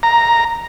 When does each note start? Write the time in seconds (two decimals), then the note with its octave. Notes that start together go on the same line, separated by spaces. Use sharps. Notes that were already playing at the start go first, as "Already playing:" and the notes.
0.03 A#5